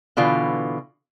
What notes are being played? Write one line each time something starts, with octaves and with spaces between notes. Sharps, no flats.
B2 D3 E3 F4